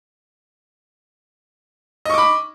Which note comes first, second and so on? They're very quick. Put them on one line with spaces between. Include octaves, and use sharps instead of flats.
D#5 C#6 D6 B5